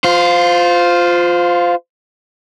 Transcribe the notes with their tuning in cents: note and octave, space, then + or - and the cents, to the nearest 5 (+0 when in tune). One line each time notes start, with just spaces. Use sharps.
F4 +10 C5 -20